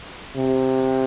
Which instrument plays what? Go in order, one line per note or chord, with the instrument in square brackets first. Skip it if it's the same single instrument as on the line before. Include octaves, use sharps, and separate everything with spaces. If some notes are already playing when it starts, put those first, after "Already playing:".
[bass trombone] C3